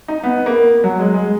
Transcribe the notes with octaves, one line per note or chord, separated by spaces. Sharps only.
D#4
B3
A#3
F#3
G#3
G#3